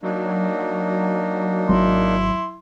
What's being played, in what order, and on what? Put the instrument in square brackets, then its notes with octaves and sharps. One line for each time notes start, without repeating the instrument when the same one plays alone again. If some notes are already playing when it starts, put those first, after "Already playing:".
[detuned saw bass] F#3 [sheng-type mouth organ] A#3 D4 D#4
[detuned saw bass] G#1 [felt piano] F#3 [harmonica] E4 C6